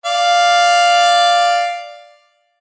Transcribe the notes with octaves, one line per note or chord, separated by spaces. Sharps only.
D5 F5